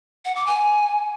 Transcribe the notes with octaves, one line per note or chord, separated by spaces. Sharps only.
F#5
D6
G#5